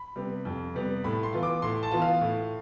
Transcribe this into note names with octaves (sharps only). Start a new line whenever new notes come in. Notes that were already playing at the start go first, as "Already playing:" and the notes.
Already playing: B5
C3 G3 B3
F2
C3 G3 B3
A2 B5
C6
E3 B3 F4
D6
A2 C6
A5
E3 B3 F4
F5
A2